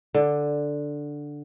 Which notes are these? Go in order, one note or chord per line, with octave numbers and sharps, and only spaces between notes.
D3